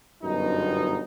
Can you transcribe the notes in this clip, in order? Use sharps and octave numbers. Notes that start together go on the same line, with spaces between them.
G1 F#2 B2 D#4